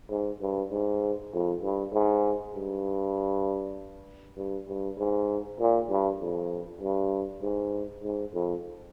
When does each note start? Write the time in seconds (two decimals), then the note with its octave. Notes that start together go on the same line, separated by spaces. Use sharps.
0.10 G#2
0.41 G2
0.71 G#2
1.33 F2
1.63 G2
1.93 G#2
2.55 G2
4.37 G2
4.68 G2
4.99 G#2
5.60 A#2
5.90 G2
6.20 F2
6.81 G2
7.42 G#2
8.03 G#2
8.34 F2